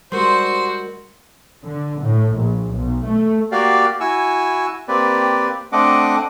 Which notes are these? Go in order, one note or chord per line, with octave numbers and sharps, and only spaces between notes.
G3 G#3 F#4 A#4 C5 C6
D3
A2
A#1
B1
A3
A#3 F#4 G4 D5 F5
E4 F#4 G#5 C#6 E6
A#3 C4 G4 B4 D5
A3 C4 D4 D#5 F#5 D6